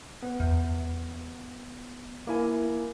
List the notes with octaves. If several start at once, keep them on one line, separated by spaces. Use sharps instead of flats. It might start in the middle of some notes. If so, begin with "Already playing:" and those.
B3
E2
A#3 E4 G#5